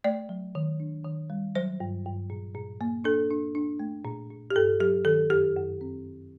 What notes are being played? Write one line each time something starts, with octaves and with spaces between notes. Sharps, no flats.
A3 D5
F#3
D#3
D4
D#3
G3
F#3 C5
G2
G2
A#2
A#2
A#3
D4 A4
D4
D4
A3
A#2
A#2
G4
G2 A4
F#3 G4
D#3 A4
F#2 G4
F#2
C4